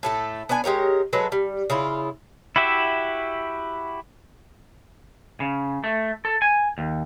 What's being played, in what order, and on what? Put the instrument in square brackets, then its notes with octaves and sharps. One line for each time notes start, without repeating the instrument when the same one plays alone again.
[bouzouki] A2 A3 A4
B3 D4 D5 G#5
G#3 G4 A#4 C#5
F#3 G#3 A4 B4
G3
C#3 E4 F4
[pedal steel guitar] E4 F#4 G4 E5
[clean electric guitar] C#3
A3
A4
G#5
D#2